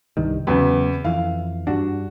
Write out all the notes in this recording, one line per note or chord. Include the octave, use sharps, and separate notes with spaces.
C2 G2 D#3
E2 C#3 F#3 A3 B3
F2 E3 F5
G2 D4 F#4